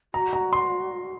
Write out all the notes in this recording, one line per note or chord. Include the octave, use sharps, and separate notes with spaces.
F#4 A#5
A#5
C6